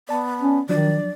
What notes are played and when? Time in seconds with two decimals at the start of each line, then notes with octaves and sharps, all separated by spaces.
0.09 B3 D5 A5
0.42 C#4
0.69 D#3 F3 F#3 D4 D5